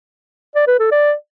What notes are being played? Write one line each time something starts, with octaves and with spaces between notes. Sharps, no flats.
D5
B4
A4
D5